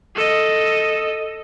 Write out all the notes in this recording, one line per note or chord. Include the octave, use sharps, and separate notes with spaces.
A4 D#5